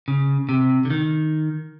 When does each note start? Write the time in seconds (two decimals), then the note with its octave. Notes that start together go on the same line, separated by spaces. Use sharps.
0.08 C#3
0.49 C3
0.85 D3
0.90 D#3